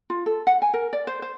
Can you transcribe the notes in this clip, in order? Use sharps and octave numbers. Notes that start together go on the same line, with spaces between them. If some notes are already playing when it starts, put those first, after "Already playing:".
F4
A4
F#5
G#5
A#4
D5
C5
C5